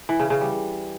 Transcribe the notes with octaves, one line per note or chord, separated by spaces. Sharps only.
E3
C#3
C#3
G3